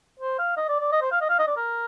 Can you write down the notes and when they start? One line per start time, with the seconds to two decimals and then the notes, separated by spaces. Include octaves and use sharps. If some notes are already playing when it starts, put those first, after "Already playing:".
0.20 C5
0.39 F5
0.57 D#5
0.69 D5
0.80 D5
0.92 D#5
1.02 C5
1.11 F5
1.21 D#5
1.29 F5
1.39 D#5
1.47 D5
1.57 A#4